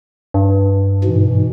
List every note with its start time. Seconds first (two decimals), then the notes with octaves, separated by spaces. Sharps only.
0.34 G2
1.04 G#2 B2 E3